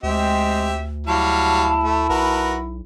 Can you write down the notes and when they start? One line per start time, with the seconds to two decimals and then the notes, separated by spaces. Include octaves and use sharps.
0.03 D2 G#3 C4 G4 E5
1.07 F#3 G3 E4 F5 A5
1.84 A3
2.10 B1 F#4 A#4 B4